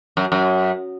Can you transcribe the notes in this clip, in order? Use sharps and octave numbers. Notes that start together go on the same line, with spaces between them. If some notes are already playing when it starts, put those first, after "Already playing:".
F#2
F#2